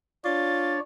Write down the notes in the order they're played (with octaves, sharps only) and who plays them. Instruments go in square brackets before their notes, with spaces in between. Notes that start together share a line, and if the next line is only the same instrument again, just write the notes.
[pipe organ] D4 C#5 D5 [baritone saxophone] F4 [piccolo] A6